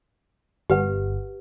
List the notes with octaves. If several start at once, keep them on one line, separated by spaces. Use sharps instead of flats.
G1 G4 B4 F#5